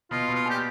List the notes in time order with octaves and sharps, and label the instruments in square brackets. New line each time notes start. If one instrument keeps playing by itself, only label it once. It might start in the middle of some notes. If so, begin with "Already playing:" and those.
[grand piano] B2 [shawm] F4
[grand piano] B2
[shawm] F4
[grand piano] A#2 [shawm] G4